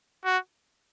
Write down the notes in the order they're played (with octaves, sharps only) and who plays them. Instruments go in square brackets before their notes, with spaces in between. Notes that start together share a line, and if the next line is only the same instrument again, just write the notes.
[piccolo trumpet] F#4